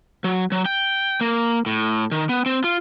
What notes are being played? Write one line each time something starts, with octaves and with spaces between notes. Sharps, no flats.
F#3
F#3
G5
A#3
A2
D#3
B3
C4
F4